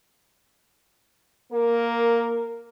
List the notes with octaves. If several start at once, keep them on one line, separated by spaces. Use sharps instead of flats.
A#3 A#4